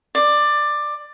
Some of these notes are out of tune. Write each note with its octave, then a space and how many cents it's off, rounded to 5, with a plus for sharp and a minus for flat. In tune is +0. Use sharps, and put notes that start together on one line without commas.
D5 +15